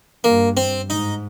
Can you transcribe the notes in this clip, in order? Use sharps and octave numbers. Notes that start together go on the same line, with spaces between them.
G2 A#3
C4
G#2 D#4